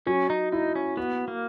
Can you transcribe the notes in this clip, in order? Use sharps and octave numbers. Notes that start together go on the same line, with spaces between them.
F#3 C#4
D#4
D#4 E4
C#4
B3 F#4
A#3